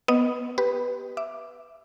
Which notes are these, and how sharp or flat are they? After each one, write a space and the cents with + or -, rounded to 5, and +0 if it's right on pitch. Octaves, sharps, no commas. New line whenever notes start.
B3 +0 D#5 +0 D#6 +0
G4 -5 B4 +0
E5 +0 D6 +0